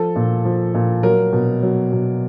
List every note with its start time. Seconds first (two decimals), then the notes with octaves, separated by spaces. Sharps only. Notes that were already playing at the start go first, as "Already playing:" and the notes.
Already playing: F3 A4
0.16 A#2
0.45 F3
0.74 A#2
1.03 F#3 A#4
1.33 B2
1.63 F#3
1.92 B2